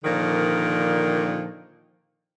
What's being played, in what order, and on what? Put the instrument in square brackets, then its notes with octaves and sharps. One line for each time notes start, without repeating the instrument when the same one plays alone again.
[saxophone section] A#2 D3 D#3 F3